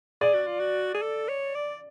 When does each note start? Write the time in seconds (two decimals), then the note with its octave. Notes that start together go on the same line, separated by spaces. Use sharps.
0.21 G#4 D5
0.34 F#4
0.47 F4
0.59 F#4
0.94 G#4
1.02 A4
1.29 C#5
1.55 D5